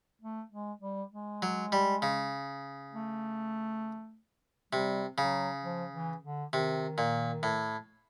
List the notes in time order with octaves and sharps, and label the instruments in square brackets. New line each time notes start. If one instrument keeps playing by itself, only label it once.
[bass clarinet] A3
G#3
G3
G#3
[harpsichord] F#3
G3
C#3
[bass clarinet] A3
[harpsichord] C3 [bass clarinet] G3
[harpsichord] C#3 [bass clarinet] F#3
[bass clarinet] F3
E3
D3
[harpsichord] C3 [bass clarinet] D#3
[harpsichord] A#2
A2